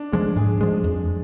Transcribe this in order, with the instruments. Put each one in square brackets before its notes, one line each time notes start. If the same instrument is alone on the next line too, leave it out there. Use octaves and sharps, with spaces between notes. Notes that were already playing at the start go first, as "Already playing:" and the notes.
Already playing: [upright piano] D4
[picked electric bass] F3 G#3 [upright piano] D4
[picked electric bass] G#2 [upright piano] G#4
[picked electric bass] F3 G#3
F2